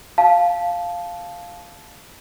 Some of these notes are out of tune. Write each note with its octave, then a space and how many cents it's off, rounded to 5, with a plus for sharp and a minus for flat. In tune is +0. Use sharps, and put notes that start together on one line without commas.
F5 +0 A5 -15